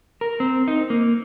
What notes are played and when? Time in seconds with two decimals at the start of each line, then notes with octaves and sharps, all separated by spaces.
0.21 A#4
0.40 C4
0.68 D#4
0.90 A#3